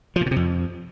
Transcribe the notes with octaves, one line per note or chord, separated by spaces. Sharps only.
F3
A#2
B2
C3
F2